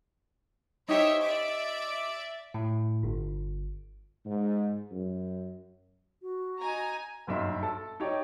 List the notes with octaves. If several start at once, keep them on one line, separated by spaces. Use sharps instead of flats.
D#4 G4 C5 C#5 E5
D5 E5 D6
A2
G1
G#2
F#2
F#4
D#4 G#5 A#5
F#1 B1 G2 E5 C6
A4 A5
D#4 G4 C#5 D5